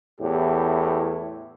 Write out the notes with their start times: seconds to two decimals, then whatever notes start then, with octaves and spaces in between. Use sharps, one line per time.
0.19 E2 A2 G4